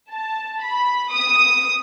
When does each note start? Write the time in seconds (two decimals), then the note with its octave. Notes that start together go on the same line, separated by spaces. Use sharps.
0.11 A5
0.63 B5
1.13 D#6